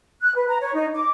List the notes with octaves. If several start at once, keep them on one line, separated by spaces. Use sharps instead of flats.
F#6
B4
A#5
C#5
D#4
D6